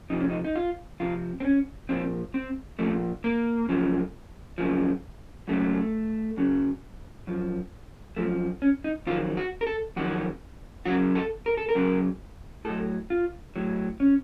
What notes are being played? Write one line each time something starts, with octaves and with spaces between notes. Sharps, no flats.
F2 C3 F3 D#4
C#4
D#4
D#4
F4
F2 C3 F3 F4
C4
C#4
A#2 F3 C4
C4
A#2 F3 A3
A#3
F#2 C#3 F3
F#2 C#3 F3
F#2 C#3 F#3 A3
F#2 C#3 F#3
F#2 F3
F#2 F3 A3
C#4
D#4
F2 D#3 F#3 F4
F#4
A#4
A4
F2 D#3 F#3 F#4
F#2 C#3 F#3 F#4
A4
A#4
A4
A#4
F#2 C#3 F#3
A2 F#3 A4
F4
A2 F#3
C#4